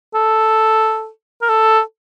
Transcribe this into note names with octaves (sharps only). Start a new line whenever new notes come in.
A4
A#4
A4